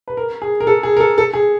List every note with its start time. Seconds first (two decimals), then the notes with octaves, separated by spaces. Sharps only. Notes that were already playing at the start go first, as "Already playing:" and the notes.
0.08 B4
0.17 A#4
0.42 G#4
0.60 A#4
0.67 A4
0.83 G#4
0.97 A#4
1.00 A4
1.18 A4
1.33 G#4